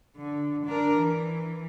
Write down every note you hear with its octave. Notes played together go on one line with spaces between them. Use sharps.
D3
D4 A#4
E3